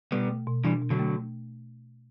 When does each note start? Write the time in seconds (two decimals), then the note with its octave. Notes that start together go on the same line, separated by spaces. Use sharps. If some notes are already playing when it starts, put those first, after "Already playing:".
0.12 B2 G3 B3
0.29 A3
0.47 B2
0.64 E3 G3 D4
0.82 B2
0.90 D3 F#3
0.99 A3